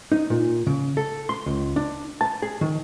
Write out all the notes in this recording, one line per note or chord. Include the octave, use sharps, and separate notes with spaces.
D#4
A#2
C#3
A4
C6
C#2
D4
A5
G#4
D#3